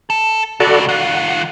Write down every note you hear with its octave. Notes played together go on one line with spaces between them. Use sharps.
A4
C#2 C#3 F#4 A4 D5
D#3 F4 F#5